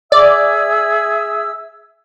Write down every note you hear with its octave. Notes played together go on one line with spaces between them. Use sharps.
G#4 D5 E5 E6